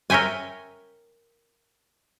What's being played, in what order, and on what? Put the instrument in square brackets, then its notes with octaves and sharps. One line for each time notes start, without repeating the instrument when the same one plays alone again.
[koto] A#4 C#5 E5 G5 G#5